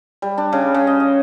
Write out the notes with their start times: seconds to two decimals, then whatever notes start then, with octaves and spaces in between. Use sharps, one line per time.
0.22 G3
0.38 D4
0.52 C#3
0.74 C#3
0.87 D#5
1.00 D#5